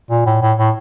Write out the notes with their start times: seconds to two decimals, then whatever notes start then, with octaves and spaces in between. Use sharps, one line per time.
0.10 A#2
0.26 A2
0.42 A2
0.58 A2